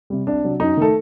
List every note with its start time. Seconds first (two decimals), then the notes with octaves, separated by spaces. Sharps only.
0.10 C3 G3
0.27 C2 D4
0.44 C3 F#3
0.60 F#2 D#4
0.77 D#3 A3 A4